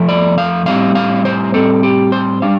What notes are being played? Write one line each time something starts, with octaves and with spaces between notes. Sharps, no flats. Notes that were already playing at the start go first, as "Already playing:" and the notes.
Already playing: F2 F3 A3
D5
F5
A2 G3 C4 F5
F5
C5
A2 G3 C4 A4
G4
C5
G3 D4 F5